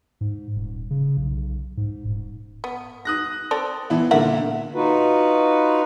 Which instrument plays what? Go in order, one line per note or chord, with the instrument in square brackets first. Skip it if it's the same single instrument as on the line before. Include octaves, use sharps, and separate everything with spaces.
[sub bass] G#2
D#1
C#3
B1
G#2
D#1
[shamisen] B3
[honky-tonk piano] D#6 F#6 A#6
[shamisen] C4 A4 D5
[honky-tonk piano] E3 B3 E4
[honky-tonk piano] A#2 D3 [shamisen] A#4 E5 F#5
[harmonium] D#4 F4 F#4 B4